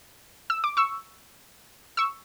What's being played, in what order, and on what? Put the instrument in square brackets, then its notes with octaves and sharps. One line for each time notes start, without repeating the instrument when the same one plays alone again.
[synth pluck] E6
D6
C#6 E6
C#6 E6